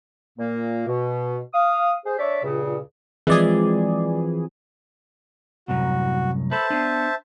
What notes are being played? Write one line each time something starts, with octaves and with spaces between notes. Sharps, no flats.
A#2 A#3
B2
F5 D#6
G#4 C5
D4 C#5 D5 E5
C#2 G2 A#2 C#3
E3 F3 G#3 C4 G#4 D5
C2 F#2 A2 F#4
A4 B4 C5 E5 A5
B3 D4